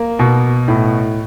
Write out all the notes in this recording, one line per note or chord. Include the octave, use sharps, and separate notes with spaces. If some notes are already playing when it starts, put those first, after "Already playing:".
Already playing: A#3
B2
A2